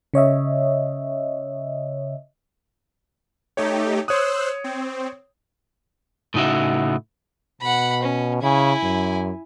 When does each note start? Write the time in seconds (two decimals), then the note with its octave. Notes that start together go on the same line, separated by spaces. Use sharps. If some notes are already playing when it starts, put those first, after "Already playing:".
0.14 C#3 C#5 D#5 E5
3.57 A3 D#4 G4 C#5
4.08 C5 C#5 D#6 E6 F#6
4.64 C4
6.34 A2 C#3 D#4 F#4 E5
7.61 B2 F#5 B5
8.03 C#4
8.42 C#3 E4 G#5
8.83 F#2